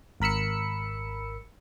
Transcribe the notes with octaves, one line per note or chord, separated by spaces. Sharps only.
G#1 A#4 B5 E6 C#7